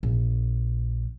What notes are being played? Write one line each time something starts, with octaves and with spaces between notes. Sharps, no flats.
A#1